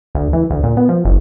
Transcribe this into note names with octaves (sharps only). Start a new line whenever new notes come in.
D2
E3
D2
A#2
B3
F3
F#1